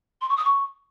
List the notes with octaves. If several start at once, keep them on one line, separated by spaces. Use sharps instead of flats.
C6
C#6
D#6
C#6